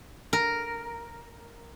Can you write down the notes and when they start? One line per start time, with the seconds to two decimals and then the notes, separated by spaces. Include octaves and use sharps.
0.33 A#4